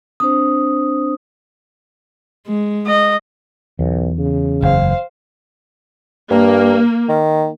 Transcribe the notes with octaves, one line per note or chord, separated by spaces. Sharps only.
C4 D4 C5 D#6
G#3
D#5
B1 E2
C#3
F#1 C5 F5
G2 A#3
D#3